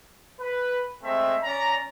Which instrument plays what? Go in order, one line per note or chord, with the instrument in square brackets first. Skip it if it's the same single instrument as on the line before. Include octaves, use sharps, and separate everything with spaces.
[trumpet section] B4
G#3 A3 C4 E5
C#4 D5 A#5